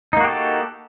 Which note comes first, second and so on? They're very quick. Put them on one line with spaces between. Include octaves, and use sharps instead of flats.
D#4 A#3 F#4 G4 A4